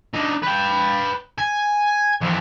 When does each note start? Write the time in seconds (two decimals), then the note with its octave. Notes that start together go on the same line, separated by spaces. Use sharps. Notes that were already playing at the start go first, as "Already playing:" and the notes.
0.14 D4 D#4
0.42 B4 G5
1.38 G#5
2.21 F2 E3